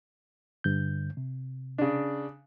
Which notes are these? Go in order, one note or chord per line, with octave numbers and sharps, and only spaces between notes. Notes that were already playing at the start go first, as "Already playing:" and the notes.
G2 D3 G6
C3
C#3 D4